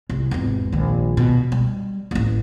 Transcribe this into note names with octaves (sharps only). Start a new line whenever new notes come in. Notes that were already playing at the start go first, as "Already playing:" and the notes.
C2
G#1 E2
A#1 D#3
B2
G3
A1 D#2